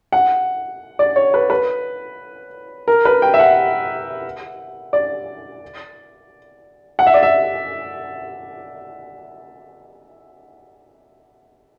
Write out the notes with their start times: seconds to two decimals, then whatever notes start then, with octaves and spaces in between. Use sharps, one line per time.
0.12 F#5
0.99 D5
1.16 C#5
1.34 B4
1.50 B4
2.88 A#4
3.05 B4
3.22 G5
3.34 E5
3.39 F#5
4.93 D5
6.99 F#5
7.07 E5
7.14 D5
7.23 E5